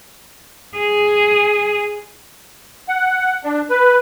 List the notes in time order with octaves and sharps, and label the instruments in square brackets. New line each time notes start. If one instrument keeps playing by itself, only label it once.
[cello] G#4
[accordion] F#5
D4
B4